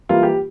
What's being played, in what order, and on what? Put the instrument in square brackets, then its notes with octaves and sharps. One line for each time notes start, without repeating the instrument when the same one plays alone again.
[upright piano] E3 G3 A#3 F4
G4